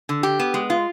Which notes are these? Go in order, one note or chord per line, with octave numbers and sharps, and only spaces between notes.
D3
G4
B3
G#3
F4